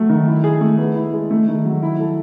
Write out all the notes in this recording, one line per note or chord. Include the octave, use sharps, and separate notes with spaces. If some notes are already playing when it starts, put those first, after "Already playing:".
Already playing: F#3 A3
D#3
E4
G#4
A3
B3
E4
G#3
A3
D#3
F#3
E4
A4